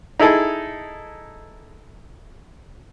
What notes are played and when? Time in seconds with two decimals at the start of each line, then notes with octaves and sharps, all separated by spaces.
0.19 D#4 E4 G#4 A4